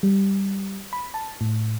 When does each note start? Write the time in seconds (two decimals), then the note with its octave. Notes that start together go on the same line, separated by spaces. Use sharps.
0.03 G3
0.93 B5
1.14 A5
1.41 A2